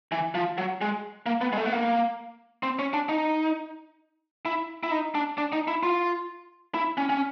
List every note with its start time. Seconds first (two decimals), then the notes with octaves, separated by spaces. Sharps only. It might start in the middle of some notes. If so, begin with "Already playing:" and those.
0.12 E3
0.35 F3
0.58 F#3
0.81 G#3
1.26 A#3
1.41 B3
1.53 G#3
1.57 A3
1.66 B3
1.72 A#3
2.63 C4
2.79 C#4
2.94 D4
3.09 D#4
4.46 E4
4.83 E4
4.91 D#4
5.15 D4
5.38 D4
5.53 D#4
5.68 E4
5.83 F4
6.74 E4
6.98 C#4
7.10 C#4